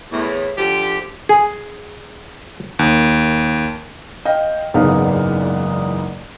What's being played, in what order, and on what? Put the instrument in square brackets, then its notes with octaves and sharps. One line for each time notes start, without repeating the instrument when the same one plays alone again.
[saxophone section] E2 A2
D3 F3 G4
[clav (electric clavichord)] G#4
[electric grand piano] D#2
[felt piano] D#5 F5 G5
F#1 E2 G#2 B3 D#4 F5